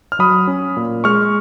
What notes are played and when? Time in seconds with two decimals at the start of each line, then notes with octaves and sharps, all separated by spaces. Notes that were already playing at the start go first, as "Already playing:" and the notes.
0.12 F6
0.19 F#3 B5 D#6
0.47 C#4
0.77 A#2
1.04 G#3 C#6 F6